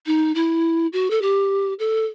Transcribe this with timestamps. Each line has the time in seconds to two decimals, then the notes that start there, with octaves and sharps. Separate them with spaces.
0.06 D#4
0.35 E4
0.93 F#4
1.10 A4
1.22 G4
1.79 A4